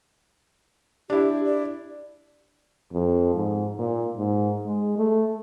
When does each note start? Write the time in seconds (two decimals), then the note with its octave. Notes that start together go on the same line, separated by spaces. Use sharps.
1.10 D4 E4 G4
1.45 D5
2.92 F2
3.34 G#2
3.78 A#2
4.17 G#2
4.66 G#3
4.97 A3